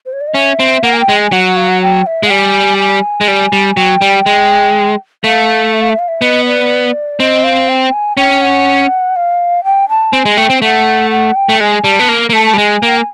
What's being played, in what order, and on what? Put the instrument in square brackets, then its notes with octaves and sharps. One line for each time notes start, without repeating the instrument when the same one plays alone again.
[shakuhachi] C5
C#5
D5
D#5
[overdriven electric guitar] C#4 [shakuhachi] E5
[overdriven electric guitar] C4
[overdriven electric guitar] A#3 [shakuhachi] F#5
[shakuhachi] G#5
G5
[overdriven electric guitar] G#3
[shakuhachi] G#5
[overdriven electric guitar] F#3 [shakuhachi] F#5
[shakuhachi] F5
F#5
G5
E5
[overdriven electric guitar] G#3
[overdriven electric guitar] G3 [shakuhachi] G#5
[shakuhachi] G#5
[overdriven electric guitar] G#3
G3
G3
[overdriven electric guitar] F#3 [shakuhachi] G5
[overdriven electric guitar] G3
G#3
[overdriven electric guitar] A3 [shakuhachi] F5
[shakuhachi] E5
F5
E5
F5
E5
[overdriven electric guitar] B3 [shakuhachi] D#5
[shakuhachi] D5
[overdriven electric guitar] C4 [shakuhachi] D#5
[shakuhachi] F5
G5
G#5
[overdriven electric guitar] C#4 [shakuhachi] G5
[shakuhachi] F#5
F5
G5
A5
[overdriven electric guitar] C4 [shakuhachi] G#5
[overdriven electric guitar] G#3
[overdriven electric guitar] A3 [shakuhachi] G5
[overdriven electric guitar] C4
[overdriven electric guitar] A3 [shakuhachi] F#5
[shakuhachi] F#5
G5
[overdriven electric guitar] A3
[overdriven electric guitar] G#3 [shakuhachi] G#5
[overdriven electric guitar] G3 [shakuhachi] A5
[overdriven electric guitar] B3
A#3
A#3
[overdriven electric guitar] A3 [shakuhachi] A5
[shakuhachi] A5
[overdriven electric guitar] G3
[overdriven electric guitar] G#3 [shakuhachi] G#5
[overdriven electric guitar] A#3
[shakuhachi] G5
G#5